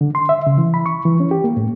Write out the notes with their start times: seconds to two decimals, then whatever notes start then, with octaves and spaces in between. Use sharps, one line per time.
0.01 D3
0.15 C6
0.29 E5
0.47 C#3
0.58 E3
0.74 B5
0.86 C#6
1.05 E3
1.20 C#4
1.31 G4
1.44 A#3
1.57 A2